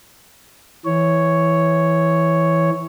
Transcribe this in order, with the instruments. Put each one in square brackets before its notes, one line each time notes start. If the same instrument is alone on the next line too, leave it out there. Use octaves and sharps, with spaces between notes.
[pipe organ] E3 C#5